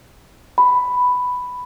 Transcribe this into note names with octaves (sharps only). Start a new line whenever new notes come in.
B5